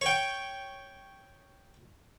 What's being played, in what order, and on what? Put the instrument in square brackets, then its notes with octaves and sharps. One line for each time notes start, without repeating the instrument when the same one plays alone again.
[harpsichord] C#5 G5